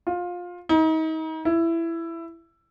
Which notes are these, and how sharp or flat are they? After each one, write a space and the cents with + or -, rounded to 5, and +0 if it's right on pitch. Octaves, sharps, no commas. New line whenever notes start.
F4 +20
D#4 +35
E4 +15